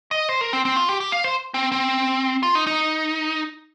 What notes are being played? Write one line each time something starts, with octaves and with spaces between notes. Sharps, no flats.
D#5
C5
A#4
C4
C4
F4
G4
G4
F5
C5
C4
C4
F4
D#4
D#4